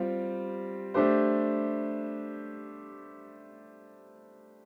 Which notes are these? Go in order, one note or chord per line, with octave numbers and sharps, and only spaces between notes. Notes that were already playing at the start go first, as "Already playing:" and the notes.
Already playing: G3 C4 F4
A3 D4 G4 C5